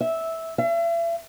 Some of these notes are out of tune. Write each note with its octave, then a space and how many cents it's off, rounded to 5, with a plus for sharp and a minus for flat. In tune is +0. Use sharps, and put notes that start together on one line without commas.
E5 -10
E5 +40